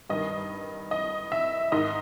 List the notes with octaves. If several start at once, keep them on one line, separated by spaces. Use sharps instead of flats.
G2 D#3 D#5
D#5
E5
G#2 D#3 D#5